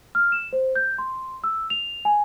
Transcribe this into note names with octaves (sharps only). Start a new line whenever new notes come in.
F6
E7
C5
G6
C6
E6
F7
G#5